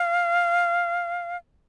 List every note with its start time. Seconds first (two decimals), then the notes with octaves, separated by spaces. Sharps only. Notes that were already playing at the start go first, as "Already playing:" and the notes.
Already playing: F5